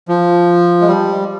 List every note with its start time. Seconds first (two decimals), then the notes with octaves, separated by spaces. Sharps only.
0.08 F3
0.81 G#3
0.88 G3